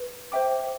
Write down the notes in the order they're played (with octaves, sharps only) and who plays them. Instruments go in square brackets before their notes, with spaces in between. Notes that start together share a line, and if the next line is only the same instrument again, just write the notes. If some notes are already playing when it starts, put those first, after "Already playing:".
Already playing: [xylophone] B4
C5 E5 G5 D6